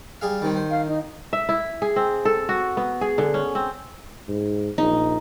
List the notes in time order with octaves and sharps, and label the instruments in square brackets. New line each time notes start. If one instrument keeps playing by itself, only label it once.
[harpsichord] G3 G#4 F5
[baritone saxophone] D#3 [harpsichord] G3 C4
[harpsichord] C5
[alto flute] F5
D#4
[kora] E5
E4
G#4
C4
A4
F#4
B3
G#4
D3
C#4
C4
[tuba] G#2
[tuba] A#1 [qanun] D#4